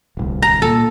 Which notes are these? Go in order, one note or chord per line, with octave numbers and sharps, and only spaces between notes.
D1 C2
A#5
A#2 A4